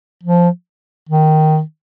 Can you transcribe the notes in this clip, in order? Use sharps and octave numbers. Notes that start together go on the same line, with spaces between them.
F3
D#3